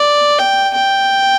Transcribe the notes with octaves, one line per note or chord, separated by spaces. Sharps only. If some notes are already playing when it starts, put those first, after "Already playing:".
Already playing: D5
G5
G5